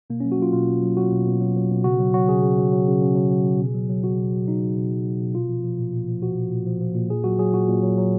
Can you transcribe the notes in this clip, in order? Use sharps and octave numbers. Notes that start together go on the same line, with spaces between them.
B2 A#3
F#3 C#4
F#4
F#3 F4
B2 F4
B2
F#3
F#3 F#4
B2
B2
F#3
F#3
B2
C#3 F#4
F#3
F#3 F#4
C#3 G#4
C#3
F#3
F#3
C#3
C#3
F#3
F#3
C#3
B2
F#3
F#3
B2 F#4
B2
F#3
F#3 D#4
B2
B2
F#3
F#3
B2
A#2 F4
F3
F3
A#2
A#2
F3
F3 F#4
A#2
A#2
F3
F3
A#2
A#2 G#4
F#3 F#4
F#3 G#4
A#2 F#4
A#2
F#3
F#3